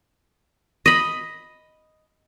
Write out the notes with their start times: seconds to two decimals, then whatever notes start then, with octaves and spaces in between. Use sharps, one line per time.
0.86 D#5 B5